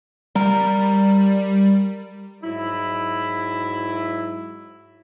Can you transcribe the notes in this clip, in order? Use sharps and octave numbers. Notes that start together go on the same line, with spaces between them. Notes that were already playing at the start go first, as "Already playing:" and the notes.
G3 A#4
G#2 F#3 E4